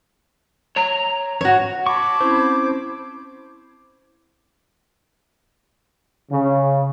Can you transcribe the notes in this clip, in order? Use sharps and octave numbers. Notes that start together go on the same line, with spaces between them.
C#5 A#5
E2 G#2 F#4 C#5
A5 B5 C#6 D6 G#6
C4 C#4 E4 C5
C#3